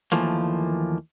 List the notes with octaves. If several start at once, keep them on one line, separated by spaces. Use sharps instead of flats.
D#2 E3 F3 A3 A#3